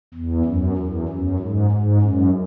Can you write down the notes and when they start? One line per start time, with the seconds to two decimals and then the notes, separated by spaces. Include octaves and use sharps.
0.14 E2
0.45 F#2
0.77 E2
1.08 F#2
1.39 G#2
1.70 G#2
2.02 F#2